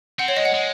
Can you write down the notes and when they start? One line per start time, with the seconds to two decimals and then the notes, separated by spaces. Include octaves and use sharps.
0.19 C4 F#5
0.28 C#5
0.37 G#3 D#5
0.45 F#5
0.54 G#3